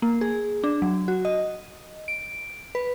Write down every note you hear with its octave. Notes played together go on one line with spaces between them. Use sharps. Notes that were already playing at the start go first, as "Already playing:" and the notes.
A#3
G#4
D4
F#3
F#4
D#5
D7
B4